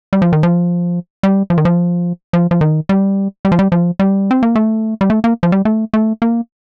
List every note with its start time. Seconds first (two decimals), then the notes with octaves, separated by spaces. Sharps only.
0.13 G3
0.22 F3
0.33 D#3
0.43 F3
1.23 G3
1.50 F3
1.58 D#3
1.65 F3
2.33 F3
2.51 F3
2.61 D#3
2.89 G3
3.45 G3
3.52 F3
3.59 G3
3.72 F3
3.99 G3
4.31 C4
4.43 A#3
4.55 A3
5.01 G3
5.10 A3
5.24 A#3
5.43 F3
5.52 G3
5.65 A3
5.94 A3
6.22 A#3